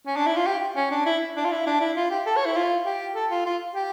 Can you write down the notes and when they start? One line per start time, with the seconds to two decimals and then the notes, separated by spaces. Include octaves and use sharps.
0.06 C#4
0.16 D4
0.27 E4
0.36 F4
0.47 G4
0.76 C#4
0.91 D4
1.06 E4
1.36 D4
1.45 F4
1.51 E4
1.67 D4
1.81 E4
1.96 F4
2.11 G4
2.26 A4
2.37 C#5
2.46 E4
2.56 F4
2.86 G4
3.15 A4
3.31 F4
3.46 F4
3.75 G4